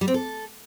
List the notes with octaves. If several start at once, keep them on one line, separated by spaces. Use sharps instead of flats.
G3
C4
A4